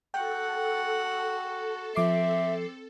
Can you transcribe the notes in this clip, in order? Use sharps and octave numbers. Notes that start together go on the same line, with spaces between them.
F#4 A4 F#5 G5
F3 C4 E5 D6 C7